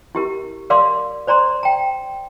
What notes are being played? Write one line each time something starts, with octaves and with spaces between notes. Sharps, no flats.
E4 G4 A#4
A#4 D5 F5 C6 D6
C5 D5 A#5 C6
G5 A#5